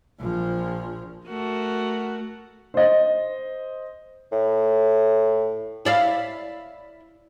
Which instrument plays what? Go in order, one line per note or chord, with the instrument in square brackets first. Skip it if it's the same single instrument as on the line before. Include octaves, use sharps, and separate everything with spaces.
[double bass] A#1 F3
[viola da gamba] A3 F#4 A#4
[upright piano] C5 D#5
[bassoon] A2
[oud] E4 D5 F5